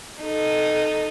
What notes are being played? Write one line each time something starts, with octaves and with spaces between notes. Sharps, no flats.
D#4 A4